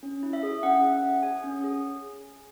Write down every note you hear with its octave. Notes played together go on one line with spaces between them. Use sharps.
C#4
E4
E5
G#4
C#4 F#5
C#4
F#5
G#4
G#4 G#5
C#4
G#4